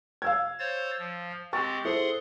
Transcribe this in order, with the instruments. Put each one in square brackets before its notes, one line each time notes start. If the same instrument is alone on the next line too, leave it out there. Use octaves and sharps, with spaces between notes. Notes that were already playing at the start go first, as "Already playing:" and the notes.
[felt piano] F5 E6 G#6
[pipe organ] C5 C#5 A6
F3
[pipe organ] G#3 C4 G4 [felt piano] C#6 A6
[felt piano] E4 A4 C5 [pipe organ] G#4 F#5 C6